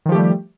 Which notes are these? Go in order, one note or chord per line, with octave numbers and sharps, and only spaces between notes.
D#3 F3 G3 A3 G4